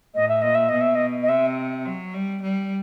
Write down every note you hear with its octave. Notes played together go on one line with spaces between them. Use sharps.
A2 D#5
E5
A#2 D#5
E5
B2 D#5
E5
D#5
D#5
C3 E5
F#3
G3
G3